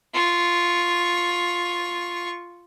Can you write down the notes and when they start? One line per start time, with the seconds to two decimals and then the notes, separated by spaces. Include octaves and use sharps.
0.14 F4 C#6